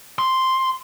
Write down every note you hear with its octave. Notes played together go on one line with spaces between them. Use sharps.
C6